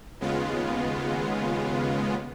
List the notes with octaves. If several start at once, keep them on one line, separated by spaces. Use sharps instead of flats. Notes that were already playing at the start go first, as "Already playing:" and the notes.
D#2 C#3 G#3 B3 F4